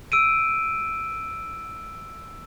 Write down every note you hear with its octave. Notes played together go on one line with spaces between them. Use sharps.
E6 D7 D#7